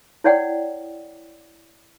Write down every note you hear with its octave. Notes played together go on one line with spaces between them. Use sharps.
E4 C#5 D5 F#5 G5